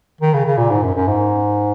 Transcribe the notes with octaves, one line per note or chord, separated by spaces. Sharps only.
D#3
C#3
C#3
A#2
G#2
F#2
F#2
G#2